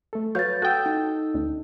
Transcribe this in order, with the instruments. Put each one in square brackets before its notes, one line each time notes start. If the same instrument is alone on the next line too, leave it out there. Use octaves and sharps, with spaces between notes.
[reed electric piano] A3 A4
[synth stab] F#3 [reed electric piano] B4 C#5 F5 [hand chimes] G6 A6
[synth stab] F#4 G5 [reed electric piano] A4 D#6 E6
[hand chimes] D#4
[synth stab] D2